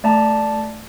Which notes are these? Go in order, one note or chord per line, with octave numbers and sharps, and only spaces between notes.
A3 D5 E5 A5 A#5